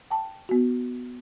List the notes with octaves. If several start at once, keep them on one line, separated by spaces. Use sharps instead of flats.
G5 A5
B3 F#4